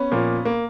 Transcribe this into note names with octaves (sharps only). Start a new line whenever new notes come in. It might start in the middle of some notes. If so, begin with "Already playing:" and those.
Already playing: B3 C#4
A#2 F3 A#3
A#3